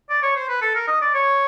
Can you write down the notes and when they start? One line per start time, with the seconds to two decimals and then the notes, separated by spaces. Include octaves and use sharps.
0.10 D5
0.23 C#5
0.36 C5
0.49 B4
0.62 A4
0.75 A#4
0.88 D#5
1.01 D5
1.14 C#5